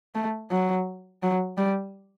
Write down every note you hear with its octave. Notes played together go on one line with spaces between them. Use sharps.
A3
F#3
F#3
G3